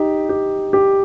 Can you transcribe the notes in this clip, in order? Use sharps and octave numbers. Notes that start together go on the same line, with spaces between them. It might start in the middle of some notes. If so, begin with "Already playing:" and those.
Already playing: D#4 G4
G4
G4